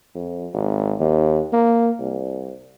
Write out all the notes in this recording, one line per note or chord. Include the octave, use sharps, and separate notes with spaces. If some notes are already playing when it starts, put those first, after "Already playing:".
F2
G#1
D#2
A#3
C2